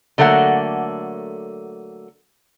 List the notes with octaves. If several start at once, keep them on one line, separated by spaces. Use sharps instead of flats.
D3 F#3 A3 A#3 F#5